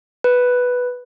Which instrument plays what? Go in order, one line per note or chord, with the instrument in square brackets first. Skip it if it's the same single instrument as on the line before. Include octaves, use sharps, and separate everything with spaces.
[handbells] B4